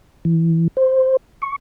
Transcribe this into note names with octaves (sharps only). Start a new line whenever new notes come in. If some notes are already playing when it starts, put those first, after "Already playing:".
E3
C5
C#6